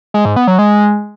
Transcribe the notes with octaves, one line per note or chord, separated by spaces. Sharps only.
G#3
G#2
B3
F#3
G#3